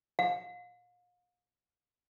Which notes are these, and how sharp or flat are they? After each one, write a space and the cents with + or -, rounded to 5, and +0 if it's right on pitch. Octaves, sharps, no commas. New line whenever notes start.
F5 +35